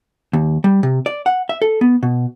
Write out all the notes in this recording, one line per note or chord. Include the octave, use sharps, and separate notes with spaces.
D#2
G3
C3
D5
F#5
E5
A4
B3
B2